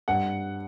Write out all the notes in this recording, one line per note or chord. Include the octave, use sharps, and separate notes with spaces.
G2 F#5